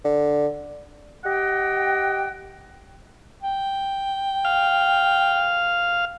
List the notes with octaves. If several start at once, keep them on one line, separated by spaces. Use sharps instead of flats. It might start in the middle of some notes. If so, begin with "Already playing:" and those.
D3
G4 D#5 F#5 G5
G5
F5